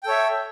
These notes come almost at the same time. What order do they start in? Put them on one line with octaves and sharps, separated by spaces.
G5 A4 C#5 E5